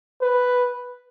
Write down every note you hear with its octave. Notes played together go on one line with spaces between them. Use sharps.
B4